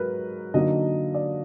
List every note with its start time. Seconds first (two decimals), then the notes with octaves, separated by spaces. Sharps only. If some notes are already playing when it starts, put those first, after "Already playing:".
Already playing: G#2 F#3 A#4 B4
0.54 D3 F#3 A#3 D#4 D#5
1.14 D5